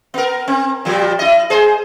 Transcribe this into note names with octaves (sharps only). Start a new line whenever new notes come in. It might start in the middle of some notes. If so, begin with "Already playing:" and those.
B3 A#4
C4
A#2 F3 G3
E4 D#5
G#4 C5